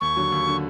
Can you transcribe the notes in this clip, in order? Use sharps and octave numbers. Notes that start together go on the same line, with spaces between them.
D#2 C#6
D3 F#3
D#2
D3 F#3